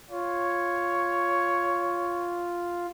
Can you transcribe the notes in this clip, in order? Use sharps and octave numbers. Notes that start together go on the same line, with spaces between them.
F4 C#5